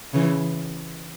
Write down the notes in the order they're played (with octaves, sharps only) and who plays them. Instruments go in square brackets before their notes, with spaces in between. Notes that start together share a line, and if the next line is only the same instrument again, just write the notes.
[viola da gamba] C#3 E3